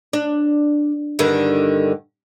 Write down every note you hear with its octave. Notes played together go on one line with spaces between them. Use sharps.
D4
G2 D3 D#3